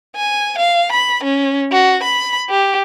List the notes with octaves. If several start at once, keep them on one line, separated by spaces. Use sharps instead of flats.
G#5
F5
B5
C#4
F#4
B5
G4